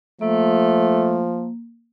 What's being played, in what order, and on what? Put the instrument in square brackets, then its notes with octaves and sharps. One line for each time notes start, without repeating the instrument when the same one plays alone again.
[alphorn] F3 [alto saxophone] A3 [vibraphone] A#3